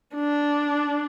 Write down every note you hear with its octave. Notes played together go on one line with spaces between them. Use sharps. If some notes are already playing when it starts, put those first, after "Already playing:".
D4